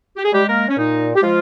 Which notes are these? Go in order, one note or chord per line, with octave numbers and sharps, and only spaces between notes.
G4
G#4
G3 G#3 G4
A#3 A#4
C#4
A#2 D#4
G4
F3 G#3 F4